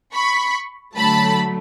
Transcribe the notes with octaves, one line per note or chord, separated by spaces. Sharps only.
B5 C#6
D3 F#3 A3 A5 B5